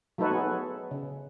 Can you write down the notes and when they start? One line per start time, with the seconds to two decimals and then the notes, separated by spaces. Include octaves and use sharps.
0.18 F#3 A3 D#4 A4 B4 C#5
0.31 B3 G#4
0.91 C#3